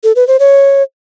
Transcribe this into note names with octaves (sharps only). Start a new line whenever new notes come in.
A4
B4
C5
C#5